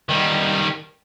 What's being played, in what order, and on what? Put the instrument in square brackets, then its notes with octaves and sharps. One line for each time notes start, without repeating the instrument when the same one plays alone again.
[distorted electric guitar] D#3 G3